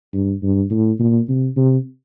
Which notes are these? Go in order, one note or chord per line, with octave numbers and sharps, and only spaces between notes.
G2
G2
A2
A#2
C3
C3